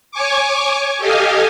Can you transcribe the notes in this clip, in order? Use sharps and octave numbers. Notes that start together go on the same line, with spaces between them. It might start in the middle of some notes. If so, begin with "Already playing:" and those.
C#5 G#5 C#6 D6
G4 A4 D#5 F5 G#5